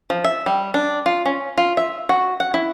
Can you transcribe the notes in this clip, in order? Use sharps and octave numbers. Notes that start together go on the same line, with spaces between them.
F3
E5
G3
D4
F4
C#4
F4
E5
F#4
F#5
E4